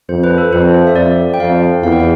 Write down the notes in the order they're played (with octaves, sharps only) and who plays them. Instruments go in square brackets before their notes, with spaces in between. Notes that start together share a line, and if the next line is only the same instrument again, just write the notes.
[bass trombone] F2 [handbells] C5
[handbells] B4
A4
[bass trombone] F2 [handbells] C5
[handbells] E5
[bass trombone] F2 [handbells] D5
[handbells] G5
[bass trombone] F2 [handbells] F5
[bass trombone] E2 [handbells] F5
[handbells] G5
F5